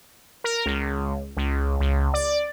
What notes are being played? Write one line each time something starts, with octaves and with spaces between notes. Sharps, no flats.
A#4
C#2
C#2
C#2
D5